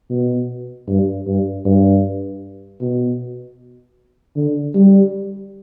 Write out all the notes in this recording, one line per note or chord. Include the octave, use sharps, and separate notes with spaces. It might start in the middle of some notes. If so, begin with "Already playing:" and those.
B2
G2
G2
G2
B2
D3
G3